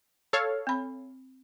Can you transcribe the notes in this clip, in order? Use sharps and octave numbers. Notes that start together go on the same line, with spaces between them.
A4 C#5 F5
C4 B5